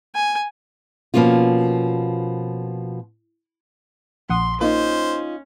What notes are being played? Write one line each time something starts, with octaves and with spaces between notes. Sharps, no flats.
G#5
B2 F3 A#3 C#4 F4
A#1 F#5 C6 D#6
A#3 C#4 D#4 F4 C5